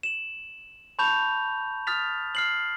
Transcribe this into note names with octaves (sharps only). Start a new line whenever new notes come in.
E7 F#7
A5 B5 C#6 G6 F7
D#6 F6 A6 B6 F7
F6 C7 F#7